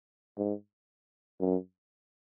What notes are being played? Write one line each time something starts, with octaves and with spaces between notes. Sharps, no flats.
G#2
F#2